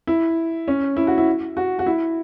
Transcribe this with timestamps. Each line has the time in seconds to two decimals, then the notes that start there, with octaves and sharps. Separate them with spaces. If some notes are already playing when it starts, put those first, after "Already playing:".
0.07 E4
0.68 C#4
0.97 E4
1.07 F#4
1.18 E4
1.57 F#4
1.79 F#4
1.86 E4